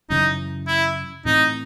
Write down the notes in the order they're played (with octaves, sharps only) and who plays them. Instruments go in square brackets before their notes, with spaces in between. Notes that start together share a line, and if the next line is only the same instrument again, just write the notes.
[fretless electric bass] F#2 C#3 E3 [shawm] D#4
[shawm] E4
[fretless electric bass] A2 E3 C4 [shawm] D#4